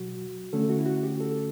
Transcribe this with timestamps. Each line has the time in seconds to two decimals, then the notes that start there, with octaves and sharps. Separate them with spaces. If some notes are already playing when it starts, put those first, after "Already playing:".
Already playing: B2 F#3 F#4
0.53 D3 A3 C#4 A4
0.70 F#4
0.79 E4
0.86 F#4
1.03 G4
1.21 A4